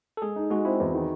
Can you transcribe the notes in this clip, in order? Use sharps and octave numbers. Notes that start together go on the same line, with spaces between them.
A4
G#3 G#4
D#4
G#3 F#4
C4 E4
E2
D#3